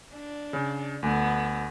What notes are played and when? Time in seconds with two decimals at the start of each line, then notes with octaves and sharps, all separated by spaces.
0.12 D4
0.53 C#3
1.03 D2 B3